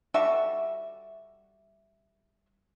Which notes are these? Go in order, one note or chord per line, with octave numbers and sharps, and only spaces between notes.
G3 F#4 A4 E5